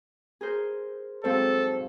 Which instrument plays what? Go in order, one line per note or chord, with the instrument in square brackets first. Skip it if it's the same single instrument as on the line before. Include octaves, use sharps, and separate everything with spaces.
[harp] G#4 A#4 C5
[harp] G#2 F#3 C4 [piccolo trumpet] A4 [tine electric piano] C5 F5